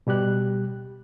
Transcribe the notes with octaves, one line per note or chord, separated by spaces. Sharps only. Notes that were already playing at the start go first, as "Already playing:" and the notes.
B2 G3 G4 F#6